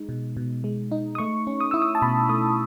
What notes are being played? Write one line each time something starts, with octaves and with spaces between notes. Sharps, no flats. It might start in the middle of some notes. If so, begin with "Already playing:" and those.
Already playing: G#3 D#4
B2
B2
G#3
D#4
D#6
A3 C#6
C#4
D#6
E4 E6
D#6
A5
B2 B5
A3 D#6